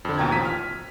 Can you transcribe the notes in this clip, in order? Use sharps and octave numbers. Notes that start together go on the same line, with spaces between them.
F2 D3
D#2 B2 G5 A#5 G#6
A1 F3 B6 D#7
F6